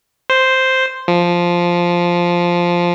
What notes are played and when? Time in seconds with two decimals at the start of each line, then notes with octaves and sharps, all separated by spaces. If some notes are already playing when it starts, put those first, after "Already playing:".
0.30 C5
1.08 F3